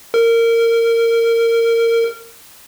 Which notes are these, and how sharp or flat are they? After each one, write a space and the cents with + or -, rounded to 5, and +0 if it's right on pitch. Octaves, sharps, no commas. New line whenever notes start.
A#4 -20